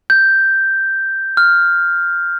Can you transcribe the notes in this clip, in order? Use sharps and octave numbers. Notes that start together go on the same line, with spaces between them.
G6
F6